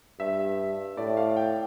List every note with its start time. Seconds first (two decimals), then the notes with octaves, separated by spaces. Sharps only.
0.20 G2 E5
0.97 A2 D5
1.17 F5
1.37 G5